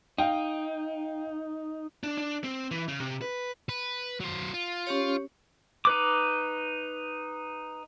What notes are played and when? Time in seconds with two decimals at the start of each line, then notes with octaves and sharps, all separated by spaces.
0.18 D#4 F5 G5
2.03 D4
2.18 D4
2.44 C4
2.71 E3
2.88 C#3
3.00 C3
3.22 B4
3.69 B4
4.20 F#3 C5
4.54 F4
4.87 C#4 G4 C#5
5.85 D#4 B4 D6